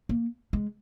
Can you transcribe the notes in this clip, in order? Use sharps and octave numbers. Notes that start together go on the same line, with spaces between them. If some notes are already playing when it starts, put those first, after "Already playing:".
A#3
G#3